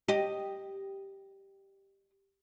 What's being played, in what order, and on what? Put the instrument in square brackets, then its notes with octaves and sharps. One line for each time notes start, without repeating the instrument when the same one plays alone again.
[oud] G4 D#5